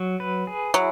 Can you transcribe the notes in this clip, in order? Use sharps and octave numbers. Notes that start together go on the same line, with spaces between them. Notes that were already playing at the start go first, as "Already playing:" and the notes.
Already playing: F#3
B4
G#4
F#3 E4